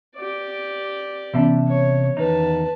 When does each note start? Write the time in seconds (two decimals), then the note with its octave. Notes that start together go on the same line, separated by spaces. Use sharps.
0.16 G4 D5
1.34 C3 E3 B3 C#4 E5 A5
1.69 C#5
2.17 E2 D#3 D#4 B4 A5